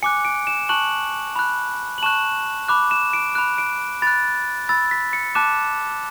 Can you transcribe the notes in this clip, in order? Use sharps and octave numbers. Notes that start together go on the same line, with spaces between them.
G#5 D6 F#6 C#7
D7
E7
A5 C#6 F#6 F#7
B5 F#6
F#7
A5 C#6 F#6 E7
B5 D6 F#6
E7
D7
B5 F#6
D7
B5 F#6 A6
B5 E6 A6
B6
C#7
A5 D6 F#6 E7